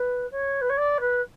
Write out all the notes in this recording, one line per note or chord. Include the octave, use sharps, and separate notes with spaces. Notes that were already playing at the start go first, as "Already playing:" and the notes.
Already playing: B4
C#5
B4
C#5
D5
B4